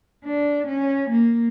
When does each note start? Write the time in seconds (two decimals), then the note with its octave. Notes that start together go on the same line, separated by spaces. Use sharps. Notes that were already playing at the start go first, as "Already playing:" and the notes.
0.25 D4
0.67 C#4
1.10 A#3